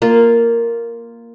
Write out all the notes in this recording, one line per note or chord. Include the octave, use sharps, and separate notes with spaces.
A#3 F4